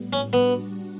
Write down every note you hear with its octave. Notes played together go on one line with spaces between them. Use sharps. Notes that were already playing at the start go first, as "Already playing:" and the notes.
Already playing: A2 G3 B3
C#4
G3 B3 D4 F#4